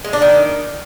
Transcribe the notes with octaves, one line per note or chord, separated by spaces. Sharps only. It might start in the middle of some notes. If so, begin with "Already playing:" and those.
G#3
D4
D#3